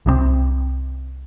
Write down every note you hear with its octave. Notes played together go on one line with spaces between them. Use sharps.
C2 C3 F3 C4